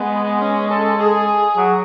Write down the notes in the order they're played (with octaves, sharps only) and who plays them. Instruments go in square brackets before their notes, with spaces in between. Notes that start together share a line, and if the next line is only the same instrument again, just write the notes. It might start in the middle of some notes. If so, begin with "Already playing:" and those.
Already playing: [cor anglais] G#3 [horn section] B3
[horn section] C#4
A4
G#4
[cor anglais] F#3